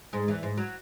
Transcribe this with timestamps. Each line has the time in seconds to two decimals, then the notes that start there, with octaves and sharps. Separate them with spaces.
0.13 G#2 G#3
0.28 E2 E3
0.43 G#2 G#3
0.57 F#3